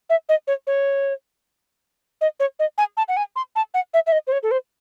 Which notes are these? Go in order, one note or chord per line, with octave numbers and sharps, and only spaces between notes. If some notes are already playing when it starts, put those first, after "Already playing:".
E5
D#5
C#5
C#5
D#5
C#5
D#5
G#5
A5
F#5
G#5
C6
A5
F#5
E5
E5
D#5
C5
C#5
A4
C5